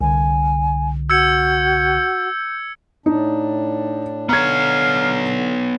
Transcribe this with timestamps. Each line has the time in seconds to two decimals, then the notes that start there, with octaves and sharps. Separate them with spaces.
0.01 C2 D3 G#5
1.10 F#4 E6 G6 G#6 C#7
3.06 A2 D4 D#4
4.29 D3 B3 C#5 F5 A#5 G#6